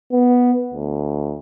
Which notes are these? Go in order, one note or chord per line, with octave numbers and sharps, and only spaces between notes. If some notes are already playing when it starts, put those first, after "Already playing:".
B3
D2